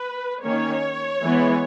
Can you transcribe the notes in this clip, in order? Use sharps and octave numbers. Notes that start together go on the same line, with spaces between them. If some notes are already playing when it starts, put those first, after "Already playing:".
Already playing: B4
D#3 A#3 C#4 C#5
E3 G#3 B3